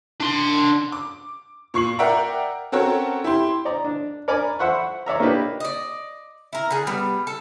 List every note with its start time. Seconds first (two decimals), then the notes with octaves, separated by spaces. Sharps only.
0.21 D4 C6
0.92 D6
1.74 A#2 C#6 C7 F#7
1.99 A#4 D5 E5 F#5 G5 A#5
2.72 C4 C#4 F#4 A4 A#4 C#5
3.24 E4 G4 C6
3.65 D5 D#5 A#5
3.84 D4
4.28 A#4 D5 G#5 A#5 B5 D6
4.59 C5 E5 F#5 B5 C#6
5.06 C#5 D5 E5 A#5
5.20 A#3 D4 D#4 G4 B4
5.60 D5 D#5
6.53 E4 A#4
6.70 D3 G#4
6.87 G3 B3
7.27 A4